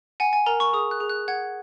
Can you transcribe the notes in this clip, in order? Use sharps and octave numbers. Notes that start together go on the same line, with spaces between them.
F#5 G#5
G#5
A#4 A#5
C#6
G#4 D#6
F#6
G#4
F#6
F#5 G#6